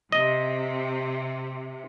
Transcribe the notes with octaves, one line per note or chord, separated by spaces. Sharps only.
C3 D#5